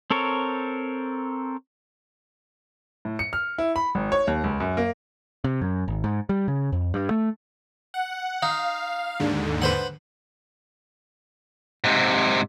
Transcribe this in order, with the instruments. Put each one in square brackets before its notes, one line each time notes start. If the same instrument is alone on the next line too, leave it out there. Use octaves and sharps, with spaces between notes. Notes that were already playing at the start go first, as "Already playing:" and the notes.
[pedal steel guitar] C4 A4 A#4 C#5
[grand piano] A2
C#7
F6
E4
B5
G#1
C#5
D#2
C#2
F#2
A#3
[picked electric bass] C3
F#2
G#1
G#2
G3
C#3
F2
G2
A3
[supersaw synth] F#5
[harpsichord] D#4 [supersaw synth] F5
[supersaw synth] D#2 G#2 D3
[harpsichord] B4 C5 F#5
[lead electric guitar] G#2 C3